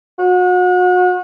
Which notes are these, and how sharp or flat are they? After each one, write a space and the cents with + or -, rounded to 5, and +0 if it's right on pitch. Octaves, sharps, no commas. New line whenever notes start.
F#4 -35